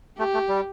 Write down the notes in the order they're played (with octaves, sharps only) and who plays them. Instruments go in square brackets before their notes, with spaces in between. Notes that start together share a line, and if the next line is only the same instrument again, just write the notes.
[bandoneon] A3 [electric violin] G4
[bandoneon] A3
G3